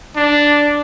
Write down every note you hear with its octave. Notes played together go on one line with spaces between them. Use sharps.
D4